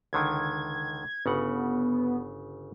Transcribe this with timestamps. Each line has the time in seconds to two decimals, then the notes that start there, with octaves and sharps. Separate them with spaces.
0.13 C#2 D3 D#3 G#6
1.26 G1 C#3 B3 F#5